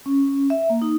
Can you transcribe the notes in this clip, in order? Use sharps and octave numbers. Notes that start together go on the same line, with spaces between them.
C#4
E5
A#3
D#4